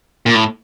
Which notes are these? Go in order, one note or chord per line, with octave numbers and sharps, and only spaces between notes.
A#2
A2